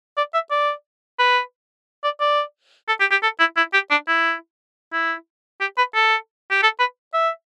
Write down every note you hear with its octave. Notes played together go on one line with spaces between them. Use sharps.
D5
E5
D5
B4
D5
D5
A4
G4
G4
A4
E4
E4
G4
D4
E4
E4
G4
B4
A4
G4
A4
B4
E5